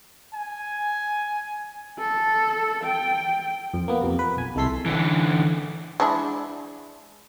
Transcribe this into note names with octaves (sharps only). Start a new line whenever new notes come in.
G#5
A4
G5
F2
A#3 B3
F2 C3
B4
B1 G#5
C2 G#3 A3 A4 C6 B6
D3 E3
G#3 D4 E4